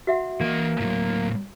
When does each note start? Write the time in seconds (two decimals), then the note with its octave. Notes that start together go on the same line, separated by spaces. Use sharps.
0.07 F#4 E5 F#5
0.41 E3 A#3 D#5
0.80 A2 F#3